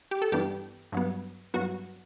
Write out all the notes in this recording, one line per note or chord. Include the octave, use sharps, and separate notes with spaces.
G4
A4
G2 E3 B3 D4 G4
G2 F#3 B3
G2 F#3 B3 F#4